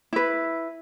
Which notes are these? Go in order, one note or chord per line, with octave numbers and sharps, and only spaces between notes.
E4 B4